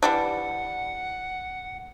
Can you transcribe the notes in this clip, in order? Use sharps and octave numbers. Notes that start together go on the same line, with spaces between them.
E3 G3 D4 F#5